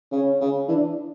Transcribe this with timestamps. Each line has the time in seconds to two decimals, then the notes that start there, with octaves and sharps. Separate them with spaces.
0.12 C#3 C#4
0.41 C#3
0.68 E3 D4